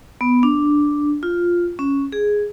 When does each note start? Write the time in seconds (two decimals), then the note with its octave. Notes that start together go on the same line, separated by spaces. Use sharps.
0.21 B3
0.43 D4
1.23 F4
1.79 C#4
2.12 G#4